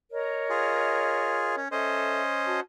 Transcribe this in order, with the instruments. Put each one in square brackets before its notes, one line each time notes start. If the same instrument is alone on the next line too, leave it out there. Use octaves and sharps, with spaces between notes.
[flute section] A#4 C#5 D#5
[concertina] F4 G#4
C#4
[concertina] C#4 C5 D#5 [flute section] A4 E5
[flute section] F#4 A5